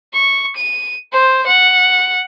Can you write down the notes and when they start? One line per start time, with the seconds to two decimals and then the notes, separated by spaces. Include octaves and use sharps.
0.13 C#6
0.56 D#7
1.12 C5
1.46 F#5